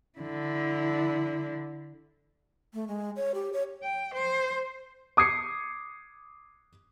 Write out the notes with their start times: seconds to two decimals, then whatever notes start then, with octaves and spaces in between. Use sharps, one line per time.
0.19 D3 E4
2.74 A3
2.88 G#3
3.16 C#5
3.35 G4
3.53 C#5
3.83 G5
4.14 C5
5.17 D6 D#6 G#6 C7 C#7